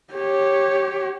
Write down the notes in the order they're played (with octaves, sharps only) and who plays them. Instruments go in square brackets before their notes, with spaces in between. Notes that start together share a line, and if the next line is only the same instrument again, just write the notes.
[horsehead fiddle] G4 C#5